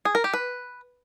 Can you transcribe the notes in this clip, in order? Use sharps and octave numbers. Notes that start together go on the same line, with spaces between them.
G#4
A#4
G4
B4